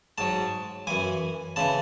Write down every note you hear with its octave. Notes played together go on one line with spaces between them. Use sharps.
G#2 F#3 A5
F#2 E3 G#5
C#3 E3 A5